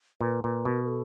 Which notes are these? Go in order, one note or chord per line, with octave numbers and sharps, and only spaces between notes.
A#2 B4
A#2 B4
B2 A#4
A#4
A4